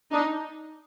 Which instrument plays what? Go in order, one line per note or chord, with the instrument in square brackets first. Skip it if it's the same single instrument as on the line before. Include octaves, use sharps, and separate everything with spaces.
[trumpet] D4 [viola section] D#4